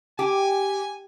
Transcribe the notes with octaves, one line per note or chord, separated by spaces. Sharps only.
G4 G#5